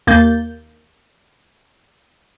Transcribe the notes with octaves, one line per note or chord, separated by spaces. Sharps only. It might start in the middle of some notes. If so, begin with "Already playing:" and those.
D#2 A#3 G6 A6